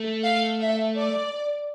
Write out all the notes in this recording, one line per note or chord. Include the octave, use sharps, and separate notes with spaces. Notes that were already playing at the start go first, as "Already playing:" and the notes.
Already playing: A3
F5
E5
D5